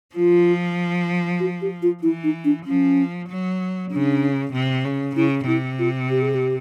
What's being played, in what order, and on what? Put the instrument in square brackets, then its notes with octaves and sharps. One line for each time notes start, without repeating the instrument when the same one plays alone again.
[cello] F3 [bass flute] F4
[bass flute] F#4
G4
F4
[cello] E3 [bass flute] E4
[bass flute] D#4
D4
[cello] F3 [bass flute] C#4
[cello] F#3
[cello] C#3 [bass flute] D4
[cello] C3
C#3
[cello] C#3 [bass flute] E4
[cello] C3 [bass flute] E4
[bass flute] F4
G4
G#4
G4